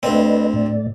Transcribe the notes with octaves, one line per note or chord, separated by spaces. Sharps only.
D2 C4 B4 D5 D#5
A2 A3 D5